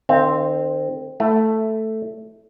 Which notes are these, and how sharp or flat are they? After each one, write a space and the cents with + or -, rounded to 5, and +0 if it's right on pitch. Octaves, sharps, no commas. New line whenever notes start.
D#3 -40 C4 +0 F5 -35
A3 +0 E4 +0